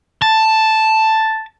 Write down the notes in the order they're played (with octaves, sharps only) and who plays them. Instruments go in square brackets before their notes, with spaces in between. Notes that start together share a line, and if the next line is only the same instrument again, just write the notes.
[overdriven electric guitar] A5